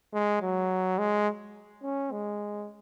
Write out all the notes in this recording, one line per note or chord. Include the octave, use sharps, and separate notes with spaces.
G#3
F#3
G#3
C#4
G#3